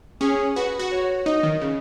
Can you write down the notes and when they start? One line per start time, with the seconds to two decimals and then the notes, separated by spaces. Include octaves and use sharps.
0.21 C#4 G#4
0.56 F#4 B4
0.79 F#4
0.92 C#5
1.26 D#4 D#5
1.43 D#3
1.61 C#3